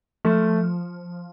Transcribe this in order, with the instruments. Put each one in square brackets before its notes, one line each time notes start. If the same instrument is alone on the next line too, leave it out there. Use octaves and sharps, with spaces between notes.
[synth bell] F3 [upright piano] A3